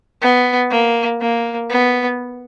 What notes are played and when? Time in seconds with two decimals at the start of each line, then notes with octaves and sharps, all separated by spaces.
0.21 B3
0.71 A#3
1.21 A#3
1.70 B3